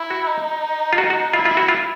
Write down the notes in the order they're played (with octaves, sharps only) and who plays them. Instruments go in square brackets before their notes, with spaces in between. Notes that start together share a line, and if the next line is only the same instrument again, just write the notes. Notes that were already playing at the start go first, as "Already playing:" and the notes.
Already playing: [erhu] E4
[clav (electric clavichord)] F#4
[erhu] D#4
[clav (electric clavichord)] F4
F#4
F#4
[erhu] E4 [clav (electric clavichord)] F4
[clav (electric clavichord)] F4
F#4
F4